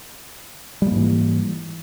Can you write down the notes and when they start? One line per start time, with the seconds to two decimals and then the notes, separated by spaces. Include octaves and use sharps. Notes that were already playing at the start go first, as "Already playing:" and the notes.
0.82 G3
0.87 A#3
0.92 G#2
0.97 E3